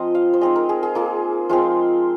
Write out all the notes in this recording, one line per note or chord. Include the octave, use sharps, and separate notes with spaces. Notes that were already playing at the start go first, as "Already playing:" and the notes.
Already playing: F3 G#3 C4 D#4 F4 D#5
F5
C5
G#3 C4 D#4 D#5
A#4
G#4
G#4
A#3 F4 G#4
F3 G#3 C4 F4